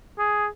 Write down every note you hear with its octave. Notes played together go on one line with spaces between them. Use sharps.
G#4